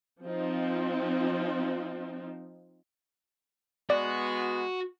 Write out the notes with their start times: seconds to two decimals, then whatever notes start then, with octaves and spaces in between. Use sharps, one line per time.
0.24 F3 C4 D#4 F4
3.90 G#3 B3 F#4 D5